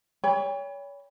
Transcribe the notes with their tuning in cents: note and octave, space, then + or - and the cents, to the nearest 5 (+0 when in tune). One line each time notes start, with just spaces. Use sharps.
C#5 +35 G5 +35 B5 +0